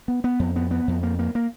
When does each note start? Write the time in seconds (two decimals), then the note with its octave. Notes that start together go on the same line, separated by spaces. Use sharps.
0.08 B3
0.24 B3
0.39 F2
0.56 B3
0.71 B3
0.88 F2
1.03 A#3
1.19 A#3
1.35 A#3